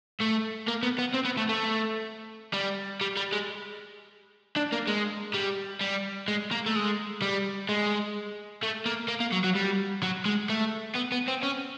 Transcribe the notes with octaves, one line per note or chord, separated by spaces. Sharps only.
A3
A#3
B3
B3
C4
B3
A3
A3
G3
G3
G3
G#3
D4
A#3
G#3
G3
G3
G#3
A#3
A3
G#3
G3
G#3
A3
A#3
A#3
A#3
F#3
F#3
G3
F#3
G#3
A3
B3
B3
C4
C#4